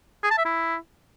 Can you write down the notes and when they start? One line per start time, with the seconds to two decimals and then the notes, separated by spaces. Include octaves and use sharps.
0.23 G#4
0.31 A5
0.38 E5
0.45 E4